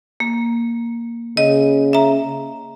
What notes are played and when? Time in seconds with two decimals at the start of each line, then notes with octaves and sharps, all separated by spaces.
0.20 A#3
1.37 C#3 D#5
1.93 E5 A#5